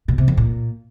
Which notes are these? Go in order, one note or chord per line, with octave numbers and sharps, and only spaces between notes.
B2
C3
F2
A#2